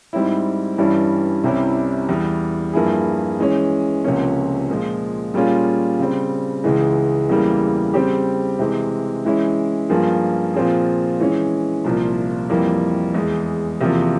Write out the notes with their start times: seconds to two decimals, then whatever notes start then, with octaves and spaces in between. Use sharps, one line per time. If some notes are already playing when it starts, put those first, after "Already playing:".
0.13 G#2 G3 C4 E4
0.78 G2 E3 G3 C#4 E4
1.44 C2 C3 G3 C#4 E4
2.09 E2 E3 G3
2.73 G2 F3 A#3 E4 G#4
3.39 E3 G#3 C#4
4.04 C#2 C3 F3 A#3 C#4
4.69 A#2 F3 G#3
5.34 A#2 G3 C#4 F4 G#4
5.99 C#3 G3 C4
6.64 C#2 C#3 E3 G#3
7.29 E2 C#3 E3 G3 A#3
7.94 C#3 G3 C4 G4
8.59 C3 E3 G#3
9.25 E3 G#3 C#4 E4
9.89 G2 F3 A#3 F4 G#4
10.54 A#2 F3 C4 F4 G#4
11.20 E3 G#3 C#4
11.84 C2 A#2 F3
12.50 F2 E3 G3 A#3
13.14 E2 E3 G#3
13.81 E2 C3 F3 A#3 F4